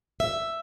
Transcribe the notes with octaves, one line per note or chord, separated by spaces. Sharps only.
E5